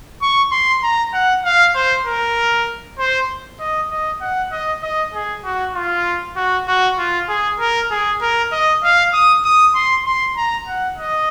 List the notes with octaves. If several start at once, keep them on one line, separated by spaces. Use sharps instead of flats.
C#6
C6
A#5
F#5
F5
C5
A#4
C5
D#5
D#5
F#5
D#5
D#5
G#4
F#4
F4
F#4
F#4
F4
G#4
A#4
G#4
A#4
D#5
F5
D#6
D#6
C6
C6
A#5
F#5
D#5